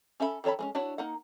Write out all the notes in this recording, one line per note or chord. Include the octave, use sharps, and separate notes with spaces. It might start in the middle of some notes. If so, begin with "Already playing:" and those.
C#4 A4 E5 F#5 B5
D#3 A4 C#5 A5 B5
G#3 C4 C#4
D4 E4 F#4 C#5
A#3 D#4 F#5